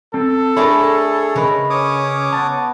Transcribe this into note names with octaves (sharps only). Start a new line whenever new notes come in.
C4 A4
A3 D4 G#4 A#4 C#5 B5
C#3 G#3 A#4 B4 B5
C#4 C#5 D6 D#6
B3 A5